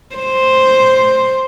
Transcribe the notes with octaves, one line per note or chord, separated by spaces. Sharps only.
C5